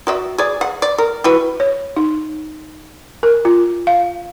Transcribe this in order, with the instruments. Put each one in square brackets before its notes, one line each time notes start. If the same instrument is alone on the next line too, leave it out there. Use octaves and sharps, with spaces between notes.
[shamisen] F#4 D5 E5
G#4 D5
F#5
D5
A#4
E4 F#4 B4
[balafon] C#5
D#4
A#4
F4
F5